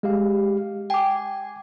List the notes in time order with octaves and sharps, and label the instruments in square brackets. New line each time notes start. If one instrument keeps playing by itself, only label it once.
[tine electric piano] G#3 G4 F5
[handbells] G5 D6 [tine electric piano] G#5